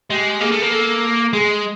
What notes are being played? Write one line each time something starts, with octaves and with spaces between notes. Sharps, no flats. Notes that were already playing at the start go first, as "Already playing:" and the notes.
G#3 G4
A#3 G#4
A3
A#3
A4
G#3 G#4